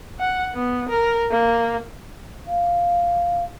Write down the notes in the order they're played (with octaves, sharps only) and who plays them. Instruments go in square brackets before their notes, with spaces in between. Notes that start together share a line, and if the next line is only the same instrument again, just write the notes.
[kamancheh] F#5
B3
A#4
A#3
[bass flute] F5